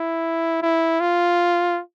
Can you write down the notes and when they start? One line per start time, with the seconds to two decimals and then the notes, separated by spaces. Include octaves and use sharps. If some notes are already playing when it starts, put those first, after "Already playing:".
Already playing: E4
0.62 E4
1.00 F4